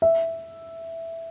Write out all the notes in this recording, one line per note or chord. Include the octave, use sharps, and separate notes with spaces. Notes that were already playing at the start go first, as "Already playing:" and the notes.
E5